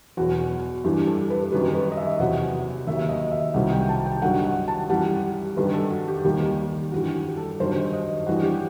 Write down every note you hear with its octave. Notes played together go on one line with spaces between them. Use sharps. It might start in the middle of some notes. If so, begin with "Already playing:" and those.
E2 B2 F#3 F#4
G2 E3 G3 G4
A4
B4
F#2 D#3 G3 B4
B4
D#5
E5
E2 C3 F#3 F#5
D#2 D#3 F#3 E5
D#5
E5
C2 C3 D#3 F#3 F#5
G5
A5
G5
G2 D#3 F#3 F#5
F#5
A5
F#2 E3 G3 F#5
G2 D#3 G3 B4
A4
F#4
G4
D#2 D#3 G3 G4
G2 E3 G3 F#4
G4
A4
G2 D#3 F#3 C5
D#5
G2 E3 G3 F#4
G4